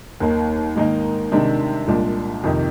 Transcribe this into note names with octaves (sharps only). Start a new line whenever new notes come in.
D#2 D#3 A#3
G#2 D#3 A#3 D#4
C3 D#3 G#3 D4
C2 A#2 G#3 D4
F2 C3 D#3